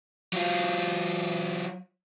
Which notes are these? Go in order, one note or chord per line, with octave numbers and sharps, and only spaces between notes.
F#3 F4